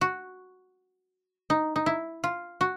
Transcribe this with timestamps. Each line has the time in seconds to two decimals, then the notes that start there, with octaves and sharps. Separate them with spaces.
0.01 F#4
1.50 D#4
1.76 D#4
1.86 E4
2.24 F4
2.61 F#4